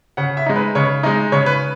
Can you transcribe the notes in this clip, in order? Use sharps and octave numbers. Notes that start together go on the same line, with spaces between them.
C#3 F#5
E5
G#3 D#4
B4
C#3 C#5
G#3 D#4
C#3 C#5
B4